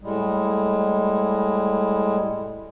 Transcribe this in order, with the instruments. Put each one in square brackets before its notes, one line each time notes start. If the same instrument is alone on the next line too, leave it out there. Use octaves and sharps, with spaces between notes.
[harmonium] A2 G3 G#3